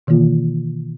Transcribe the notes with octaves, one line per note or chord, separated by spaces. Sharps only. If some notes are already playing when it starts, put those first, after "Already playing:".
B2 D#3 E3 A#3 F4